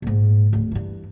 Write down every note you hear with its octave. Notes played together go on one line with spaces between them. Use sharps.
A#1 G#2
D1
G2 E3